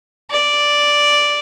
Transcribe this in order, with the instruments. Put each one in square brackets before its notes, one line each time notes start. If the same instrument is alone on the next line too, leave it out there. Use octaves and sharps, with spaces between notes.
[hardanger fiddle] D5